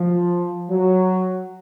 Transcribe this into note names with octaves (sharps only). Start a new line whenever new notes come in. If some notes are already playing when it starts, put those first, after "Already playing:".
Already playing: F3
F#3